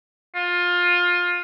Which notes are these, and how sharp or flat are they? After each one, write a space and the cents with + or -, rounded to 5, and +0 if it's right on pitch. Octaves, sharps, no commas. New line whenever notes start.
F4 +20